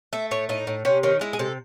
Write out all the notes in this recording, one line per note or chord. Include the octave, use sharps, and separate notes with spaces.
A3 E5
A2 C#5
A2 D#4
A2
C3 C#4
D#3 C#4
G#3 E4
G#4
C3 A4